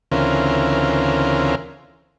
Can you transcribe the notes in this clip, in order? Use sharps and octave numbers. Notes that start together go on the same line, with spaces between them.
D2 C#3 E3 C4 F4 A#4